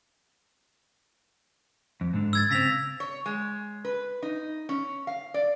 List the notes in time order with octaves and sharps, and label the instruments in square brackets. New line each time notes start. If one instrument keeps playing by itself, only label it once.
[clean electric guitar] F2
G#2 D3
[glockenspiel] E6 G#6 A6
[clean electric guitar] C#3 C4 [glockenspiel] A#6 B6 F7
[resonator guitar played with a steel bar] C#5
G#3
B4
D#4
C#4
F5
D5